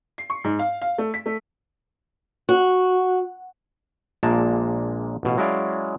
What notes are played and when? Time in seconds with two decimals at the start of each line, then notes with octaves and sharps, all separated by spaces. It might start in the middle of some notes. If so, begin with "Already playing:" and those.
0.18 C7
0.30 C#6
0.44 G#2
0.59 F5
0.82 F5
0.98 A3
1.14 B6
1.26 A3
2.49 F#4
4.23 A#1 A#2 G#3 A#3 A5
5.23 A1 B2 F5
5.37 F#3 G#3 C#4 E4 D5 F5